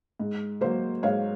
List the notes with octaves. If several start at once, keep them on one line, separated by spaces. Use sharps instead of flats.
G#2
F#3 A#3 C5
G#2 C#5 F5